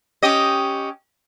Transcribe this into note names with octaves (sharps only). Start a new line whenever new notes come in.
C#4 G4 D#5